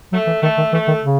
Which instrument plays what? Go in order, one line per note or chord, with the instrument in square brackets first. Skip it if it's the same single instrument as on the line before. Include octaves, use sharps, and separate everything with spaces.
[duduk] F#3 [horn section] A3
[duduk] E3
[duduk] D#3 [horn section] A3
[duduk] D#3
[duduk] E3 [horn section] A3
[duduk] D#3
C#3